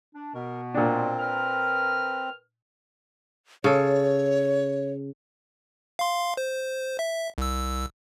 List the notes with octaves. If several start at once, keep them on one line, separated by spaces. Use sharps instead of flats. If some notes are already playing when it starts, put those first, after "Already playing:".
D4
B2 B3 A#4
A#2 C4 D4
A#4 B4 F6
C#3 A4 C#5
F5 C6
C5
E5
C2 E6